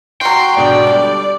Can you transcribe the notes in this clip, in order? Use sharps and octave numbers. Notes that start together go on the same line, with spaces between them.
F#3 F#4 G5 C6
G#2 B2 D3 D5
G3 D4 A4